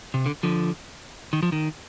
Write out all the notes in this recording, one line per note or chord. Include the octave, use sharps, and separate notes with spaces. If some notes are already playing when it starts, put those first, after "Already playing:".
C3
D3
D3 F3
D#3
F3
D#3